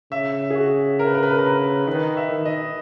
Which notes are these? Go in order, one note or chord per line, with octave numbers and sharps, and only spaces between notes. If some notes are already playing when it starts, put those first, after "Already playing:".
C#3 E5
G#4
F#4
A#4
B4
A#4
B4
A#4
B4
A#4
D#3 B4
E5
D#3
D#5